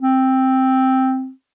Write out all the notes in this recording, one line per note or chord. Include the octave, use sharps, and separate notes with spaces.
C4